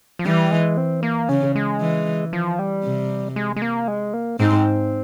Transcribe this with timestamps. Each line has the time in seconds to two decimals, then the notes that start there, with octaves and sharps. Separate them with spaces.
0.19 F3
0.26 E3 G3
0.51 G#3
0.77 C4
1.03 A#3
1.29 C#3 C#4
1.55 G#3
1.81 E3
2.33 F3
2.59 G3
2.84 C3
3.36 G#3
3.56 G#3
3.62 A#3
3.88 G#3
4.14 A#3
4.39 G#2 C4